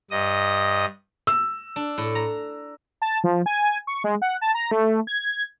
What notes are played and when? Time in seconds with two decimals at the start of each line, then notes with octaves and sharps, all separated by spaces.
0.11 G2 D#5 D#6
1.27 E6
1.76 D4
1.98 A2
2.15 A#5
3.02 A5
3.24 F3
3.46 G#5
3.87 C#6
4.04 G#3
4.22 F#5
4.41 A5
4.55 A#5
4.71 A3
5.07 G#6